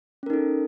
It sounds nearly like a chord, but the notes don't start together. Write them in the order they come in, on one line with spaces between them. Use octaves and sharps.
C#4 A#4 D#4 A4